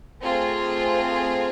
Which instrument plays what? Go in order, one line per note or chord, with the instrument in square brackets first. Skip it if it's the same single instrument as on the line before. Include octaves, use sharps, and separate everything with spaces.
[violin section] A3 C4 F4 G#4